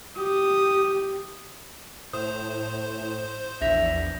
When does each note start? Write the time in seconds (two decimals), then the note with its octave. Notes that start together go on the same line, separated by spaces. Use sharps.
0.17 G4 D#6
2.13 A2 C5 D#6
3.61 A#1 E2 E5 G6 A#6 F7